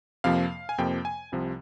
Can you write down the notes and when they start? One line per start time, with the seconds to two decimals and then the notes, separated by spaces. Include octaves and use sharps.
0.24 F2 C3 F3 A#3 F5
0.69 G#5
0.78 F2 C3 F3 A#3 G5
1.05 G#5
1.32 C2 C3 F3